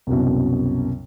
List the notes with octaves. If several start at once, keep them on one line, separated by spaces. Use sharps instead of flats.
C2 F#2 B2